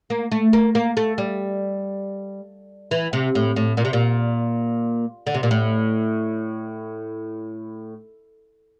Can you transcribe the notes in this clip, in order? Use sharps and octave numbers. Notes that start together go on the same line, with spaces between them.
A#3
A3
A#3
A#3
A3
G3
E3
C3
A2
A2
A#2
C3
A#2
D3
C3
A#2
A2